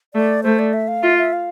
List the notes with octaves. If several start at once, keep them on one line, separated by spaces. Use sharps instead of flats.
A3 D5
A3 C5
D5
E5
F5
F4 E5
E5
F5